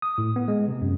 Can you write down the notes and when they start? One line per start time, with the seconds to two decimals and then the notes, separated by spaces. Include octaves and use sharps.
0.02 D#6
0.18 A2
0.36 B3
0.48 G#3
0.68 C3
0.82 F#2